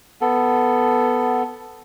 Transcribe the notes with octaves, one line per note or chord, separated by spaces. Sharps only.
B3 A4